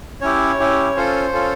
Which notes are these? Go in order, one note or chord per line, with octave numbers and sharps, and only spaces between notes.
C#4 E4 G4 C#5
C#4 E4 G4
C#4 F4 A4 C5
C#4 F4 A4